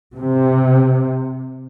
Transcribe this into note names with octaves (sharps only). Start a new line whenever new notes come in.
C3